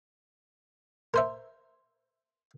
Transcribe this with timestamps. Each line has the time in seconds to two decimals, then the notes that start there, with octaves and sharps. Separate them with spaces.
1.14 A#4 C5 E5